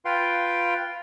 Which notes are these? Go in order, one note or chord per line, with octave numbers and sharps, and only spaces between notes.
F4 B4 F5 G5 C6